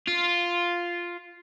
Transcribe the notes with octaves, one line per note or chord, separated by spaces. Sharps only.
F4